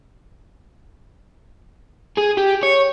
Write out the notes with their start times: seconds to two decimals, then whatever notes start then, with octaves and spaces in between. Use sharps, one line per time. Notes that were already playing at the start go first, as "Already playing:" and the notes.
2.18 G#4
2.37 G4
2.63 C#5